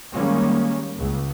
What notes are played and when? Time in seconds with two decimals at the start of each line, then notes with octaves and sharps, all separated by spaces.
0.13 D#3 G3 G#3 A#3 C#4
0.97 C#2